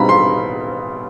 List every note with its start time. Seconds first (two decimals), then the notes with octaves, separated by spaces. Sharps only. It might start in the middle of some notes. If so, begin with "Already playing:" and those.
Already playing: B2 G3 C4 D#4 A#5 B5
0.09 C6